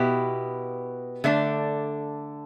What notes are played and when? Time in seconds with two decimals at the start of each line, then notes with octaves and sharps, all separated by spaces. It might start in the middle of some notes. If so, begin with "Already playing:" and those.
Already playing: B2 B3 E4 G4
1.24 D3 A3 D4